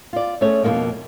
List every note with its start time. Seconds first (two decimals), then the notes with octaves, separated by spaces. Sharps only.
0.13 F4 D5
0.41 A3 C#4 G#4 C#5
0.63 F2 B2 F3 A3 A#3 D#4